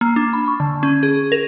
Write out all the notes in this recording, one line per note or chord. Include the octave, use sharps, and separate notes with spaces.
A#3
D4
B5
C#6
D3
C#4
G#4
A#4